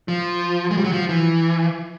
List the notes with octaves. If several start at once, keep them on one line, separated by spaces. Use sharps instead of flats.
F3
G#3
G3
F#3
F3
E3